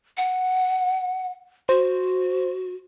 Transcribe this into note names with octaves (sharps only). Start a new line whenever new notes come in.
F#5
F#4 C5